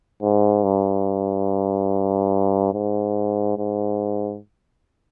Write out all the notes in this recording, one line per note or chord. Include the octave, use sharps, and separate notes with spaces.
G#2
G2
G#2
G#2